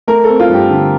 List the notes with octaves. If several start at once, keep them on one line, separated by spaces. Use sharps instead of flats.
A3 A#4
C4 A4
F4
G2 G4
D3